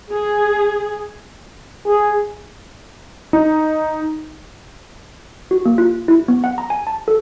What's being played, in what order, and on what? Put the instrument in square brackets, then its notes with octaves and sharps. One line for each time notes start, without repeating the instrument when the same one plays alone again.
[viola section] G#4
[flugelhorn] G#4
[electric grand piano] D#4
[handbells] F#4
A#3
F4
E4
B3
F#5
A#5
G#5
A5
A4